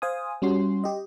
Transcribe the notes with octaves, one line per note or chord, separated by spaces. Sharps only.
C5 F5 G#5 D#6
G3 C#4 F#4 C6
G4 D#5